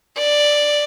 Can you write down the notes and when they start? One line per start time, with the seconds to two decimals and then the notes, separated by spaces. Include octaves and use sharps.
0.18 D5